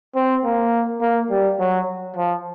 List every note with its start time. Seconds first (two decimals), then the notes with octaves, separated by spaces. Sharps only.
0.15 C4
0.44 A#3
1.01 A#3
1.30 G3
1.59 F#3
2.16 F3